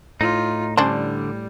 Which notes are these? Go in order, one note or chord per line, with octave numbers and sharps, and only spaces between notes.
A2 D#4 F4
D3 G3 C#4 D4 C5